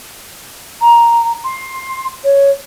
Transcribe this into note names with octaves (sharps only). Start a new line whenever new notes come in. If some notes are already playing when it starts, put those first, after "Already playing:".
A#5
C6
C#5